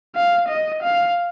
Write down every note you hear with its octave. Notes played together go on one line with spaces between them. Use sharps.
F5
D#5
F5